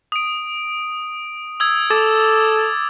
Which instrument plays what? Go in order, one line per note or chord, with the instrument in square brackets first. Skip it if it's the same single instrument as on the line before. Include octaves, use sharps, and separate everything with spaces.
[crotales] D#6 D7
D#6 E6 G#6
[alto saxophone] A4 [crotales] D6 A6